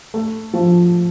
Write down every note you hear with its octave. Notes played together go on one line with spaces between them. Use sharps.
A3
F3